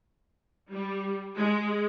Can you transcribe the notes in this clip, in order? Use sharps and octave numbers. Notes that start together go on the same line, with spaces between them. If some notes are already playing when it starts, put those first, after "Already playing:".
G3
G#3